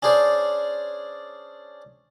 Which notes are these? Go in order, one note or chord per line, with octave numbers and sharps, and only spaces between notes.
C#4 D4 G#4 C5 D5